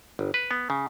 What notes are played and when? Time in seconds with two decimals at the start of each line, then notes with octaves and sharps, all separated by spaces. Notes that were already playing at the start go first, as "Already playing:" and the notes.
0.19 G1
0.34 B4
0.51 B3
0.70 C#3